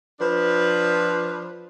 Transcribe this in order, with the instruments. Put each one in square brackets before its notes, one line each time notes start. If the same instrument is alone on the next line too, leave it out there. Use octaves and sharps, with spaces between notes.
[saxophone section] F3 D4 B4